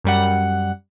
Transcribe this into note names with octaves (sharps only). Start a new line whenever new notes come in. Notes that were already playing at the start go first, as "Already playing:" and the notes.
F#2 G3 F#5